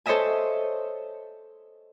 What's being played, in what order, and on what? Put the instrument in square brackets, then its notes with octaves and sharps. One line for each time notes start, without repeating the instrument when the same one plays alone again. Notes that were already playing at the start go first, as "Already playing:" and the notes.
[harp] A4 C5 C#5 D#5 E5 G#5